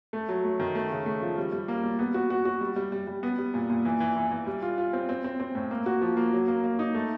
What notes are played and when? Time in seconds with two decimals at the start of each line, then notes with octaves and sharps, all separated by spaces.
0.13 A3
0.29 F#3
0.44 A3
0.60 D#3
0.75 A3
0.90 C#3
1.06 A3
1.22 F3
1.38 G3
1.52 G3
1.68 A#3
1.84 G3
1.99 B3
2.14 F#4
2.30 F#4
2.45 F#4
2.61 G3
2.76 G3
2.92 G3
3.07 G3
3.23 B3
3.38 G3
3.54 A#2
3.70 A#2
3.85 E3
4.00 E3
4.16 E3
4.31 E3
4.47 G3
4.62 F4
4.78 F4
4.93 C4
5.09 C4
5.24 C4
5.40 C4
5.55 A2
5.71 A#3
5.86 F#4
6.01 F3
6.17 A#3
6.33 F#3
6.48 A#3
6.64 A#3
6.79 D#4
6.94 A3